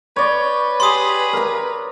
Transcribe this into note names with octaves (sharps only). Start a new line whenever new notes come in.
B4 C#5 D5 G6
G4 G#4 B5 C6 D#6
A#4 A#5